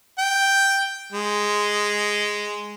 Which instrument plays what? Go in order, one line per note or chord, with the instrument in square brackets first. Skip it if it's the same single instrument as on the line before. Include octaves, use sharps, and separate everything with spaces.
[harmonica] G5
G#3